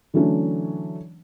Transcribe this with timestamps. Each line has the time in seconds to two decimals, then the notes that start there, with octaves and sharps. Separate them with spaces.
0.14 D3 E3 F#3 A3 C#4 D4